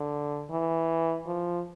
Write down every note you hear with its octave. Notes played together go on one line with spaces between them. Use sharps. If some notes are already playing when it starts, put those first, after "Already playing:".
Already playing: D3
E3
F3